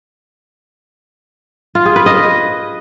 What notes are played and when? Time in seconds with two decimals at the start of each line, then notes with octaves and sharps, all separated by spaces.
1.75 F4
1.85 G#4
1.96 B4
2.06 D#5